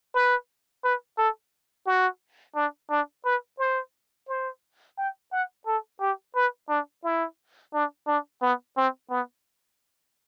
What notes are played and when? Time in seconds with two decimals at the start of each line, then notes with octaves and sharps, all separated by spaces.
0.15 B4
0.84 B4
1.18 A4
1.86 F#4
2.56 D4
2.90 D4
3.25 B4
3.59 C5
4.29 C5
4.98 G5
5.32 F#5
5.66 A4
6.01 G4
6.36 B4
6.69 D4
7.04 E4
7.74 D4
8.07 D4
8.42 B3
8.77 C4
9.10 B3